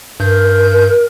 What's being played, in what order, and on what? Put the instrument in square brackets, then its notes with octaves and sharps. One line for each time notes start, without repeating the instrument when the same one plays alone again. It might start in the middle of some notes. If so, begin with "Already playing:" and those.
[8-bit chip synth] G2 G6 [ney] A#4